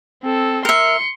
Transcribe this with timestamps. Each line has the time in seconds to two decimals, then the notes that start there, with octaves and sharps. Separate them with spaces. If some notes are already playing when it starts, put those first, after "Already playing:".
0.23 C4 A4
0.65 A#4 E5 C6 C#7